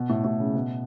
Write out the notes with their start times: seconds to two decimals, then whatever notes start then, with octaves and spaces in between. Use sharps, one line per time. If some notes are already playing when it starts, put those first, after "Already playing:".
Already playing: B2
0.09 A2
0.24 A2
0.39 C#3
0.55 B2